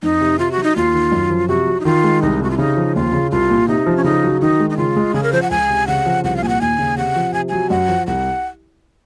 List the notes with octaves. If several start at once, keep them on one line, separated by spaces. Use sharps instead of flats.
F2 D#4
C3
C3 F4
F#4
F#3
D#4
D#2 F4
D#3
F#2
F3
C3 F#4
F#3
D#4
D#3 F4
G#3
C2 D#4
C3 F#4
F4
C#3 D#4
F3
D#2 F4
C#3
C2 F4
A#2
C3 D#4
F3
C#4
C#3 D#4
F#3
D#3 D#4
G#3
D#4
C#3 F4
G#3
C#3 G#4
A#4
F3 C5
F#5
C#2 G#5
C3
C#3 F#5
F3
C2 F#5
F5
A#2 G#5
F#5
D#2 G#5
C#3
C3 F#5
F3
C3 G#5
F#3 G#5
F#2 F#5
F3
C2 F#5